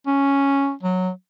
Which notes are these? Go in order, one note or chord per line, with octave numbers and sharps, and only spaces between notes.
C#4
F#3